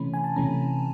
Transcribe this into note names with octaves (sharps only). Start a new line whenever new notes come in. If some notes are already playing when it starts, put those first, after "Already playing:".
Already playing: C3 E3 A3 C#4 B5
G#5
A5
C3 E3 A3 C#4 A#5